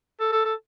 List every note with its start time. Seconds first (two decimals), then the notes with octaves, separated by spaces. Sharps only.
0.20 A4
0.32 A4
0.45 A4